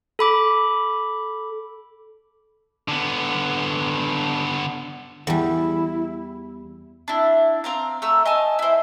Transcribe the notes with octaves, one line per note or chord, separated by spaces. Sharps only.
A4 B5 D6
D3 B3
E2 G3 E4
D4 E4
C4 F5 A#5
A3 A#5 E6
D#5 G#5 A5
E4 C5